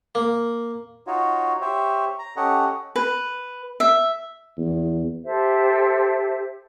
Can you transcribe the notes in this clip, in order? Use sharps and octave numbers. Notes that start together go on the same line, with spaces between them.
A#3
D#4 F4 F#4 C#5
G4 C5 C#5 E5
A#5
C#4 G4 A4 C#5 D#5 F#5
B4
E5
E2
G4 A4 C5 E5